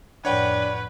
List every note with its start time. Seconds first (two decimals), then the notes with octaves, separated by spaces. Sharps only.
0.25 F2 A2 D4 B4 C#5 F#5 G5